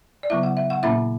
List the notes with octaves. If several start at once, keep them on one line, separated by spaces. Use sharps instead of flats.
D5
C#3 F#3 B3 E4 E5
F#5
E5
F#5
A#2 A#3 C#4 E4 E5